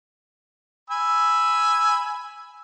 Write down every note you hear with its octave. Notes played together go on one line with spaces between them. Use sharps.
G#5 B5 E6